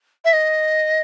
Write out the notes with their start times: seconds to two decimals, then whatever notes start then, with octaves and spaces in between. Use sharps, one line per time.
0.24 E5
0.33 D#5